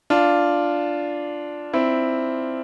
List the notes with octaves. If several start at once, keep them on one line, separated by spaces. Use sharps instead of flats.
D4 F4
C4 E4